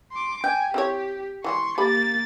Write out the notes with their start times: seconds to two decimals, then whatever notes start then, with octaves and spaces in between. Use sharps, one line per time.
0.12 C6 D6
0.44 G5 G#5
0.74 C4 E4 G4 C#5
1.44 E3 G3 G#3 C6 C#6
1.78 A#3 G4 B5 A6